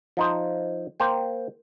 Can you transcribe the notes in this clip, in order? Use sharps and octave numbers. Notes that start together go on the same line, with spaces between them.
F3 D#4 C5
A#3 C5 G5